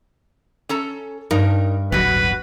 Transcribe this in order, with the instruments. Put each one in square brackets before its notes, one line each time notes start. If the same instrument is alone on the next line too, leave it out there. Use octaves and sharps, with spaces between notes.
[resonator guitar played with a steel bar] C#4 A4 A#5
[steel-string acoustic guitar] G2 [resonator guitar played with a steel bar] D#4 A#4
[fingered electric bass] D1 G1 F#3 [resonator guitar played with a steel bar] B2 F#4 [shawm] B4